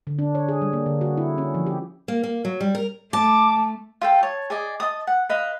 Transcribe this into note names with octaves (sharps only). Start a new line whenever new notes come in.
D3
D4
C#5
G#4
G3
A#3
D3
F#4
E4
C#4
F3
G4
A#3
A#3
F#3
G3
A#4
A3 A5 D6
F4 A4 G5
C#5 A5
G#4 D5 D#5
D#5 A5 D#6
F#5
B4 D#5 F5 B5